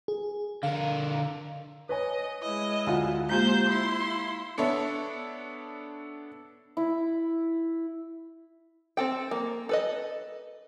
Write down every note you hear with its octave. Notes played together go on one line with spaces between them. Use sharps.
G#4
D3 A#4 F5
B4 C#5 D#5 G#5
G#3 E4 D#5
D2 F4 F#5 G#5
G#3 A#3 F4 G4 C5 A#5 G6
E4 C6
B3 D4 A4 C#5 E5
E4
C4 A4 G5
A#3
A4 B4 D#5